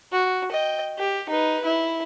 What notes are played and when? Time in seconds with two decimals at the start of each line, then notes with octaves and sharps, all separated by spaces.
0.12 F#4
0.51 D#5 G5
0.98 G4
1.29 D#4 B4
1.65 E4